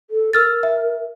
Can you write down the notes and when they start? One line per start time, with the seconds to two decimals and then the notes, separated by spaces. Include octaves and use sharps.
0.10 A4
0.33 A#4 E6 F6 A6
0.63 E5